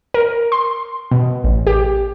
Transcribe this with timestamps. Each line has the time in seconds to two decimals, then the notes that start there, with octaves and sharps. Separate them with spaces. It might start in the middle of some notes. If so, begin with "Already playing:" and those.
0.14 A#4
0.52 C6
1.11 B2
1.44 A1
1.67 G4